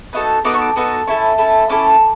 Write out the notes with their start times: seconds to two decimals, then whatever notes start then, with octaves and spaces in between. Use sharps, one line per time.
0.13 B3 D#4 F#4 A4
0.44 B3 D#4 F#4 A4 D6
0.54 C#6
0.61 D6
0.76 B3 D#4 F#4 A4
1.07 C#4 E4 A4
1.38 C#4 E4 A4
1.69 C#4 E4 A4 D6